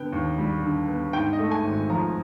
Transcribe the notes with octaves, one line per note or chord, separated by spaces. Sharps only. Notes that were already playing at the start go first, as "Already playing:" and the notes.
Already playing: D3 B3 G5
D#2
G3
D3
B3
G#2 G5
D#5
A3
G#5
G#1
F3 A#5